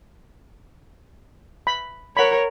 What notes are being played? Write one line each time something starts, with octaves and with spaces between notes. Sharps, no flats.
B5
A#4 C#5 F#5 B5